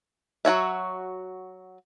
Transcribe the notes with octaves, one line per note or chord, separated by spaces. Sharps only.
F#3 F#4 C#5 E5